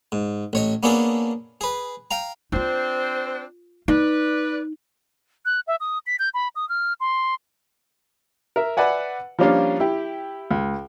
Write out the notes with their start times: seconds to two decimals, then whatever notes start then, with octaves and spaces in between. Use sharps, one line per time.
0.12 G#2
0.53 A1 C#5 D#5
0.83 A#3 B3 C#4 D4 G#4 A4
1.61 G#4 B4
2.11 F5 G5 A#5
2.52 C4 D4 D#4 F4 C5
3.88 D#4 B4 D5
5.45 F#6
5.67 E5
5.80 D#6
6.06 B6
6.19 G6
6.34 B5
6.56 D#6
6.69 F6
7.00 C6
8.56 A#4 E5
8.77 B4 D5 E5 F#5 G#5
9.39 F3 G3 A#3 C#4 D4 F4
9.80 E4 G4
10.51 C#2